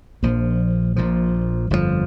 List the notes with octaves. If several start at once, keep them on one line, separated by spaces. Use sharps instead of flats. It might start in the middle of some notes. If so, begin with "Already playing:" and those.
A#1 A#2 F3
A#1 A#2 F3
G1 F2 C3 F3